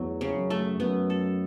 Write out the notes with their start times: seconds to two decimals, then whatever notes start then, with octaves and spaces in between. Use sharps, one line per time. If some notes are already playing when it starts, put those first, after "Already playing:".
Already playing: E2 F#3 A3
0.21 C#3
0.36 F#2
0.50 A3
0.80 F#2 B3
1.10 A4